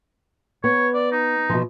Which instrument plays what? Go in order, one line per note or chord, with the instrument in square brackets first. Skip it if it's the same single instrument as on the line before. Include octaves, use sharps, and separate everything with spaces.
[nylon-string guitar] B3 [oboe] C#5
[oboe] D5
D#4
[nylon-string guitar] B2 F3